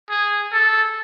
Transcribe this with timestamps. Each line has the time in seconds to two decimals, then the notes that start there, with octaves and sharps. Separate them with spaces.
0.10 G#4
0.53 A4